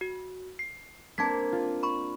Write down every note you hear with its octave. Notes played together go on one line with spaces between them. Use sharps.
F#4
C7
A#3 C4 D4 A5 G#6 B6
F4
B5 C#6